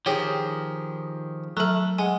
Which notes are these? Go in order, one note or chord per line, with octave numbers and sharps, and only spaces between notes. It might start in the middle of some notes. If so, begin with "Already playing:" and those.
D#3 F3 G4 G#4 C#5 G5
F#3 A3 A4 A#5 F6
G#3 F#5 G#5